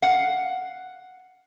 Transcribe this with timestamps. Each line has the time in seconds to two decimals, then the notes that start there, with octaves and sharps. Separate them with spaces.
0.02 F5 F#5